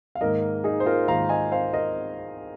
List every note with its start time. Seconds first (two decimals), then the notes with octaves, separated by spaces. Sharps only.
0.15 F5
0.21 G#2 D#3 A#3 A#4 D#5
0.64 D#4 G#4
0.80 C5
0.86 F4 A#4
1.07 G#2 D#3 A#3 F5 A#5
1.29 D#5 G#5
1.52 C5 F5
1.73 A#4 D#5